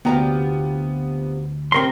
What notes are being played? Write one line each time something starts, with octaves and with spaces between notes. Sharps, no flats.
D2 C3 B3 F4 G5 A#5
A2 C3 C4 A#4 G5 C6